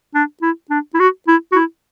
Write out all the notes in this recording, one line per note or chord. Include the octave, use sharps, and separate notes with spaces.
D4
E4
D4
E4
F#4
E4
F#4
E4